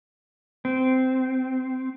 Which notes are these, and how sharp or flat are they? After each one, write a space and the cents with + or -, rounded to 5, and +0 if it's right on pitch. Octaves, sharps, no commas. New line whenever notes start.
C4 -15